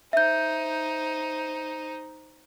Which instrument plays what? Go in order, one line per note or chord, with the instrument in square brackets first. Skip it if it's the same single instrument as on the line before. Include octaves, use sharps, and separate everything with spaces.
[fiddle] D#4 C5 [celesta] E5 G6